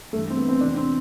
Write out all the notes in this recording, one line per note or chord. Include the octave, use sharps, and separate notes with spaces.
G2 E3 A3
C4
B3
C4
E2 C3 E3 D4
C4